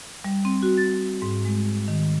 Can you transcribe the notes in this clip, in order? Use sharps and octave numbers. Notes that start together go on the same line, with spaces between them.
G3
C4
F#4
A6
G#2
G#3
D#3